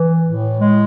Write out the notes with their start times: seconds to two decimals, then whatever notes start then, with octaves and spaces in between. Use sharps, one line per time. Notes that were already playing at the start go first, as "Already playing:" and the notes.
Already playing: E3
0.25 A2
0.59 G#3